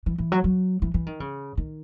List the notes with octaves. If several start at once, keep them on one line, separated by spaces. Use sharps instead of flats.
E3
E3
F#3
F#3
E3
E3
D#3
C#3
D#3